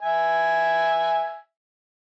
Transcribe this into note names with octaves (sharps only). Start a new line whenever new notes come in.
E5 G#5